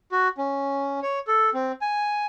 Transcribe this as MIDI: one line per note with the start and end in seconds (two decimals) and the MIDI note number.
0.12 0.28 66
0.38 1.00 61
1.03 1.19 73
1.27 1.50 69
1.54 1.72 60
1.81 2.26 80